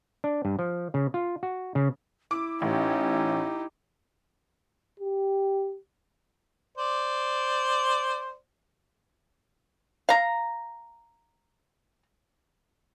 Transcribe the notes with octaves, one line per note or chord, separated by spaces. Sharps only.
D4
G2
F3
C#3
F4
F#4
C#3
E4 D6
A1 C#4 D#4 G4
G4
C5 D5
F5 A#5